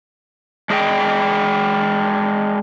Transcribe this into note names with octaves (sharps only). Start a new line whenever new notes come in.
G#3 D4 G#4 D#5 E5 G5